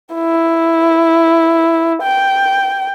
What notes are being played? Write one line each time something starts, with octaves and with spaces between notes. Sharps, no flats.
E4
G5